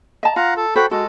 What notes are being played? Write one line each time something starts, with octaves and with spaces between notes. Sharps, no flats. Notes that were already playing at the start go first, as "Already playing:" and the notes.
D#5 A5 A#5
F4 F5 F#5 A#5
A4
F#4 A4 C5 G5 B5
G#3 F#4 A4